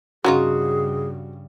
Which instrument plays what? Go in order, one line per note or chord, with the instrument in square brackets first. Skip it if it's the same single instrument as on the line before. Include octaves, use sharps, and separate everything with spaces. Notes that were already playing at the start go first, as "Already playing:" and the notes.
[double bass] G2 C#3 [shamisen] C#4 D#4 F4 [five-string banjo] F#4 [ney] G#4